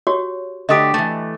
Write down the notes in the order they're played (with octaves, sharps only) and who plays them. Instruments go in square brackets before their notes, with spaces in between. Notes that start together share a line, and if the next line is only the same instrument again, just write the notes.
[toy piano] F#4 G4 C#5
[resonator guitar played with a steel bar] D3 A3 G4 [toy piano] D#5 D#6
[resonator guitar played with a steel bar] E3 A3